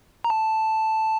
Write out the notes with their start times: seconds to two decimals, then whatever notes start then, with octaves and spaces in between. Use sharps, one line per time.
0.24 A#5
0.30 A5